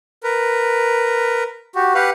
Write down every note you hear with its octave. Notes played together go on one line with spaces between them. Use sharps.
A#4 B4
F#4 G4
G4 B4 F5 F#5